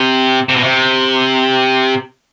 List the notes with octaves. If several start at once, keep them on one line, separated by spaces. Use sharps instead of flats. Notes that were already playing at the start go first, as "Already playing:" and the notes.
Already playing: C3
C3
B2
C3